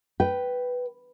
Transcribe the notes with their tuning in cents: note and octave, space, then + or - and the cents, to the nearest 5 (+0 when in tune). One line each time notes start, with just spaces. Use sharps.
B4 +0 G5 -10